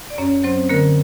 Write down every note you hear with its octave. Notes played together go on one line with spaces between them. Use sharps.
D5
F#2 C#4 C#5
F#3 C4 C5
D3 A#3 A#4